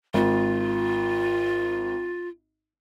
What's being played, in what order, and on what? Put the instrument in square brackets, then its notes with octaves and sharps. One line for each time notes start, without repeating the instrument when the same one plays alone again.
[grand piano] G#1 [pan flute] F4